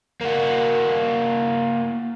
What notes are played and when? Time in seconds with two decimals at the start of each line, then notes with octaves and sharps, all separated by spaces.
0.21 A#3 F#4